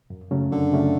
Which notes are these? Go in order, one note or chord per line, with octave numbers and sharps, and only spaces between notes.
F#2
C#3 F#3 A3 C#4
F#2 D3
C#3 F#3 A3 C#4